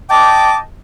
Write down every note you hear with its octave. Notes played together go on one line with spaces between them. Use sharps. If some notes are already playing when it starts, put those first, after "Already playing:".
D#5 G5 A5 D6